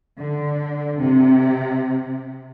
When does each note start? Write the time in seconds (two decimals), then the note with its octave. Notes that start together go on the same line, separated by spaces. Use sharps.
0.18 D3
1.00 C3